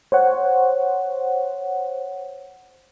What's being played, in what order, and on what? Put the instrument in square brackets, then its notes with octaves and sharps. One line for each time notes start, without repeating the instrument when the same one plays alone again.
[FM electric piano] C5 C#5 F#5